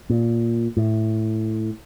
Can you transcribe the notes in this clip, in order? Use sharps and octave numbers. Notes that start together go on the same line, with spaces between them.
A#2
A2